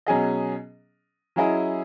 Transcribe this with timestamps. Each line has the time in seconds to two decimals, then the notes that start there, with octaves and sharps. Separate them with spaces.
0.06 B2 F#3 C#4 G#4 D#5
1.36 F#3 C#4 E4 G#4 D#5